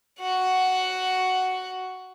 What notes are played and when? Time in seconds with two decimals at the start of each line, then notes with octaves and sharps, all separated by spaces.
0.19 F#4 F#5